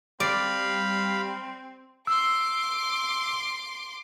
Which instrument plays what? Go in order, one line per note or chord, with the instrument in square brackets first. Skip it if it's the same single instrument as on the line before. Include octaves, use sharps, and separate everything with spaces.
[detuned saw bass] G3 [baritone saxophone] C4 [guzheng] D5 [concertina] F5 B5
[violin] C6 D6 [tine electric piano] E6